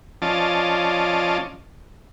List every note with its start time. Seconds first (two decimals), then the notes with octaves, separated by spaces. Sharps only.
0.22 F3 C#4 F4 D5 D#5 A5